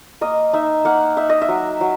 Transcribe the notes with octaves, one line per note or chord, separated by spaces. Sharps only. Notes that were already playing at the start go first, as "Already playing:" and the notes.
A#3 D#5
D#4 E5
A#3 F#5
D#4 E5
D#5
E5
F#3
F#3